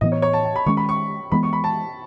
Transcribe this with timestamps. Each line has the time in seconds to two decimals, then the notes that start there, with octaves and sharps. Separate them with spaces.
0.01 A2 E3 B3 D#5
0.12 C#5
0.22 C#5
0.33 A5
0.44 A5
0.56 B5
0.66 D#3 G#3 C#4 C#6
0.77 B5
0.89 C#6
1.32 E3 G#3 B3 B5
1.43 C#6
1.53 B5
1.64 A5